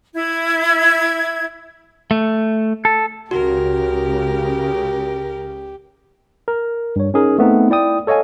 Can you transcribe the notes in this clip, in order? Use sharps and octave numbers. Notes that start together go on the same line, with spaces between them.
E4 G#6
A3
A4
C#2 C#3 F#4 G4 A#4
A#4
G2 C#5
C#4 D#4 G#4 A#4
A3 B3 C4 D#4
E4 D5 G5 D#6
A4 C#5 D#5 F5 G#5